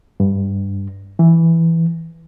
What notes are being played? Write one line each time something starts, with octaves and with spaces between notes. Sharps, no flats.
G2
E3